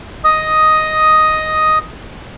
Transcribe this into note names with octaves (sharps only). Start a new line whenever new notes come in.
D#5 D#6